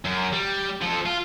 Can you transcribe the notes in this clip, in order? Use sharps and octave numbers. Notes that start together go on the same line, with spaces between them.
F#2
G3
F3 A4
F4